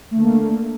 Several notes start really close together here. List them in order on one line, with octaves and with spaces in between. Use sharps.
A3 D3 A#3